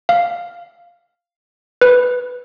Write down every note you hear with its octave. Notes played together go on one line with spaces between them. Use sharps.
F5
B4